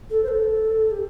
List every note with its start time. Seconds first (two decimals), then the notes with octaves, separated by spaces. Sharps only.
0.10 A4
0.23 C5
0.28 A4
0.91 G4